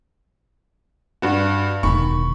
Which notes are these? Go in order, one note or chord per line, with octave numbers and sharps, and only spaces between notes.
G2 F#4
E1 D#3 B5 C#6